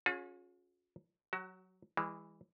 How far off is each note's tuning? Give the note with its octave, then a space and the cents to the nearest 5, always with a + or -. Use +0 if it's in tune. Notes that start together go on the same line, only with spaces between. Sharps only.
C#4 +0 F4 +45 G#4 +15
F#3 +0 F#4 +30
E3 +0 G#3 -35